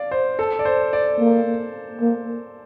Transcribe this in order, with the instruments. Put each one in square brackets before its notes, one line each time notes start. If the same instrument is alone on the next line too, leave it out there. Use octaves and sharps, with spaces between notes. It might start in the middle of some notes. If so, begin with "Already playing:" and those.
Already playing: [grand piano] D5 F5
C5
A4
D5
C5
D5
[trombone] A#3
A#3